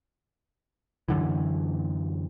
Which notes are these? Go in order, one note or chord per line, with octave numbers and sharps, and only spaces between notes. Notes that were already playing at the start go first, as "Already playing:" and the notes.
F#2 D3 E3